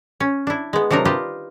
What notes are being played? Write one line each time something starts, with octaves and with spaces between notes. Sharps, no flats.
C#4
D4 E4
G#3 B3
C3 F#3 D4 D#4 A#4
F4 G4 B4 D#5